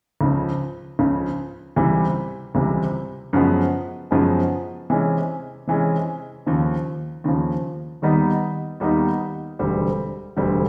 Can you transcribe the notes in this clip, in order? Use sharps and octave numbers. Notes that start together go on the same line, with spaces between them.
C#2 C#3 F3
C#2 C#3 F3
C#2 C3 E3 G3
C#2 C3 E3 G3
F#2 C#3 F3 G#3 B3
F#2 C#3 F3 G#3 B3
C3 E3 G#3 C#4
C3 E3 G#3 C#4
D#2 C#3 F3
D#2 C#3 F3
D#2 D#3 G3 B3 D#4
D#2 D#3 G3 B3 D#4
E1 D2 D3 G3 C4
E1 D2 D3 G3 C4